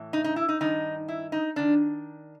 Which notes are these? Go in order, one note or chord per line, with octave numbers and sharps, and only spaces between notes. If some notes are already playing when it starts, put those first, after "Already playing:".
Already playing: A2 E3
D#4
D#4
E4
D#4
G2 D#3 D#4
E4
D#4
D#3 D4